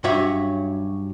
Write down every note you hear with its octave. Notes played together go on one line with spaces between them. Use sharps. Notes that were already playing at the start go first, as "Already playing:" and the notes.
G2 F#3 C#4 F#4 E5